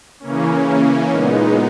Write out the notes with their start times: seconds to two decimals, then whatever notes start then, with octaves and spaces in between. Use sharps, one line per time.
0.20 C#3 E3 A#3 C#4
1.09 A#2 G#3 B3 D#4